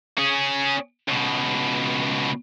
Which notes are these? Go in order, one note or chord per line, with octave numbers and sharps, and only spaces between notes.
C#4 G#4
C#2 B2